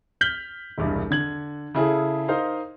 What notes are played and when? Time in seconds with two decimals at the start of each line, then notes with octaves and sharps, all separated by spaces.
0.21 F6 G6 B6 F#7 G7
0.78 E1 C2 G2
1.10 D3 G#6 F#7
1.74 C#3 E4 G#4 A4
2.28 D#4 A#4 C5 D#5 F5